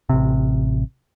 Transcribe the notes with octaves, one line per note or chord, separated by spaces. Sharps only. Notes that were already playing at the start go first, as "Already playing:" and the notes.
A1 C3